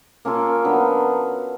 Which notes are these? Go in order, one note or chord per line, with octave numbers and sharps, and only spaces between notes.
A#3 C#4 F4 A4
D3 F#3 B3